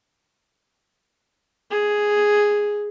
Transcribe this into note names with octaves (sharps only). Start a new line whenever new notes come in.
G#4